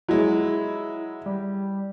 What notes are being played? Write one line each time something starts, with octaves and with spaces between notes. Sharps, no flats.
F#3 G#3 E4
G3